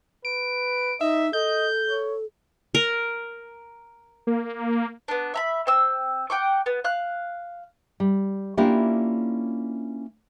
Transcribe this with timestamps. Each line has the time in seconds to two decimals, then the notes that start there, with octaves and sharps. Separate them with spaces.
0.25 B4 D7
1.01 D#4 D#5 E5
1.33 A4 D#5 G6
1.89 C#5
2.75 A#4
4.27 A#3
5.08 B3 D4
5.34 E5 A#5 B5
5.67 C4 E6
6.30 F#5 G5 C#6 D6
6.66 B3
6.84 F5 F#6
8.00 G3
8.57 A#3 C#4 D4 E4 F4 G4